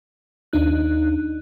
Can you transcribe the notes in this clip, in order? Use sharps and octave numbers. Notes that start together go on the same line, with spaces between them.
D#2 D4 D#4 F#6